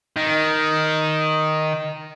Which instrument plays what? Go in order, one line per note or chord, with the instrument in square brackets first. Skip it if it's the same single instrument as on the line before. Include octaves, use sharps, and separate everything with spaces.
[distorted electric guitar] D#3